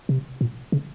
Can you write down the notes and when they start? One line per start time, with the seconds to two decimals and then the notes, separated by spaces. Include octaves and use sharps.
0.09 C3
0.41 A#2
0.72 C#3